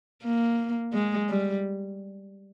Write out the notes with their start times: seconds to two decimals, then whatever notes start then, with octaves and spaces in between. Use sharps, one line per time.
0.23 A#3
0.93 G#3
1.29 G3